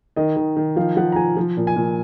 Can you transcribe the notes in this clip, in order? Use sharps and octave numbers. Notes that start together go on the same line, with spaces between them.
D#3 D#5
D#3
D#3
F3 F5
F3 F#5
A#5
F3 G#5
F3
A#2
G#5
A#2